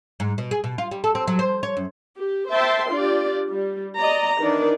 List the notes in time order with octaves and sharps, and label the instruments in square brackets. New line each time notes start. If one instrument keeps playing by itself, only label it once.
[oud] G#2
B2
G#4
B2
F4
G3
A4
C4
F#3
C5
C#5
F#2
[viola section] G4
C5 E5 G5 A5 C6
D4 F4 G4 D5
G3
D5 D#5 A#5
D#3 E3 D4 D#4 D5